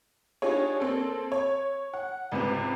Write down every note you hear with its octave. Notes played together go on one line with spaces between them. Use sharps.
D4 D#4 F4 G4 G#4 C#5
A#3 C4 A4
C#5
F#5
G#1 C#2 C3 B4